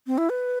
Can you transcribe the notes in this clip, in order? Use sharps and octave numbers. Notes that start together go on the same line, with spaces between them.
C4
E4
B4